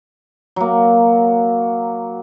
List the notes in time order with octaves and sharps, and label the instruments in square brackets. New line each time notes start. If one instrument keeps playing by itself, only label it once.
[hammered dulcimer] F#3 A#3